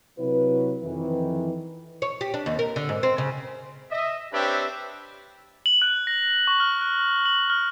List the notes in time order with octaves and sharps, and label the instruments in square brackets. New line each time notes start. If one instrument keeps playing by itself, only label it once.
[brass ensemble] C3 F#3 E4 B4
F2 D#3 E3
[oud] C#5
G4
D4
D#2
A#4
D3
G#2
C4
C#3
[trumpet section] D#5 E5
C4 D4 G4 B4 C#5 E5
[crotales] F#7
F#6
A#6
C#6
F6
F#6
F#7
F6